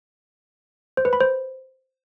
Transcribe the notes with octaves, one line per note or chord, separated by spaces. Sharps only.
C5
B4
B5
C5